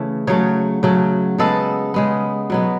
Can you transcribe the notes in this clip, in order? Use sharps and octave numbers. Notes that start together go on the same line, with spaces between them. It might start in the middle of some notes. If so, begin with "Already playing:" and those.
Already playing: C#3 E3 A3
C#3 F#3 A3 C#5
C#3 F#3 A3
C#3 G#3 B3 A4
C#3 G#3 B3
B2 F#3 B3